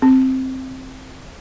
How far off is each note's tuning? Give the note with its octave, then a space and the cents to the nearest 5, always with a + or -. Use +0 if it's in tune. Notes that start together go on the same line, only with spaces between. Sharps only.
C4 +5